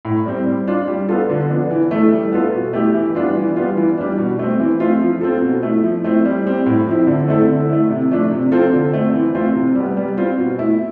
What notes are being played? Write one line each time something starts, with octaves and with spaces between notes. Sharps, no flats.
A2
G3 C4
G3
D4 F4
G3
B3 F4 A4
D3
F3 B3 D4
E3
A3 E4 A4
G3
B3 F4 A4
B2
A3 E4 G4
E3
G3 B3 D4 F4
E3
G3 B3 F4
E3
G3 D4
B2
A3 C4
E3
A3 C4 F4
F3
C4 F4 A4
B2
A3 E4
F3
A3 C4 E4
G3
C4 G4
A2
F3 C4 E4
D3
A3 C4 E4 A4
D3
A3 E4
C3
F3 A3 D4
C3
F3 C4 F4 A4
D3
A3 C4
E3
A3 C4 F4
C3
G3 B3
G3
C4 F4
B2
A3 E4